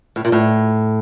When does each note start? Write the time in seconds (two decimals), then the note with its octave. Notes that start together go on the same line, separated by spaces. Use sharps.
0.16 A2
0.25 A#2
0.32 A2